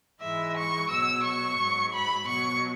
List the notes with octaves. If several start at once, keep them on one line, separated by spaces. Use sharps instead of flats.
G#2 E3 G#3 E5
C#6
B2 F#3 E6
C#6
G#2 F#3
B5
B2 F#3 C#6